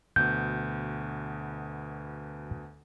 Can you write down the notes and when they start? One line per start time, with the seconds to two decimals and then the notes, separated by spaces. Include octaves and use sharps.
0.16 D2 B2 G6